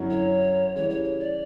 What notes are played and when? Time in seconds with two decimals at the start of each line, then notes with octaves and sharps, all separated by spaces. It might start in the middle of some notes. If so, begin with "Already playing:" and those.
Already playing: F#2 D3 F#3 C#4 E4
0.10 C#5
0.76 C#3 E3 G3 C#5
0.90 C#5
1.04 C#5
1.19 D5